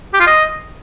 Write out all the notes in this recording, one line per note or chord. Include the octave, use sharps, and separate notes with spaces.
G4
F4
D#5